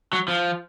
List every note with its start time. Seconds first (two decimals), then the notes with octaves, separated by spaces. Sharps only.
0.13 F#3
0.28 F3